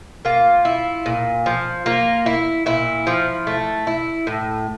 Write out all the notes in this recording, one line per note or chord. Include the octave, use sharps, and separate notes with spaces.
A#3 F4
E4
A#2
F3
A#3 F4
E4
A#2 E4
F3
A3
E4
A2